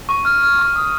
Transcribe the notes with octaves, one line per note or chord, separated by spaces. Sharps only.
C#6
F6
F6
C#6
D#6